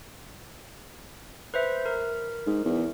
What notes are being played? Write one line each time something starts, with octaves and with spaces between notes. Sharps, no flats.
B4 C5 E5
A#4
G#2
E2